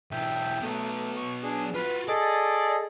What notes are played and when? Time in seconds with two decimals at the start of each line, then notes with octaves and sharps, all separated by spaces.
0.11 B1 E3 E5 G5
0.62 F#3 A3 B3
1.17 C#6
1.43 D4 G#4
1.74 F4 F#4 B4
2.08 G#4 A4 D5 D#5